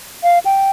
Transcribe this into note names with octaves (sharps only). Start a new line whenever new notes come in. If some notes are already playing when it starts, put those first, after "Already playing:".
F5
G5